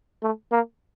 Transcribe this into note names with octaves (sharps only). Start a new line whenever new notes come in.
A3
A#3